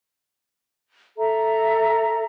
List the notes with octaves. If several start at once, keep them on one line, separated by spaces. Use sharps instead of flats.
A4 E5 A#5